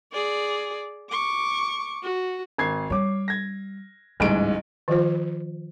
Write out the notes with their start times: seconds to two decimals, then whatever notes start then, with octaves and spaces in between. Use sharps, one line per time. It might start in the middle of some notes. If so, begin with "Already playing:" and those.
0.13 G#4 D5
1.10 C#6 D6
2.03 F#4
2.58 G#1 G#6 C7
2.90 G3 C#5 D6
3.28 G#6 A#6
4.20 D1 A1 G#2 G3 D7
4.88 D#3 F3 F4 C5